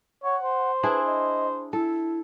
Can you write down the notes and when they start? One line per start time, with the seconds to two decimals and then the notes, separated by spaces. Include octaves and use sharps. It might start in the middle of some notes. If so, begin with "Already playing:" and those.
0.24 C#5 F#5
0.42 C5
0.83 D4 E4 G#4 B4
1.06 D#5
1.73 E4 A4